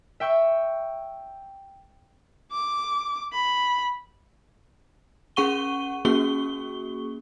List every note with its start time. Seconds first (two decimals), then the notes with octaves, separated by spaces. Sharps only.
0.20 E5 G5 C#6 E6
2.52 D6
3.33 B5
5.36 C#4 G#4 F#5 C#6 D#7 G7
6.05 A#3 C#4 F#4 G#4 C#6 G7